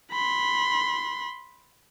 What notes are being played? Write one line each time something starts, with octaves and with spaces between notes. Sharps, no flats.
B5 C6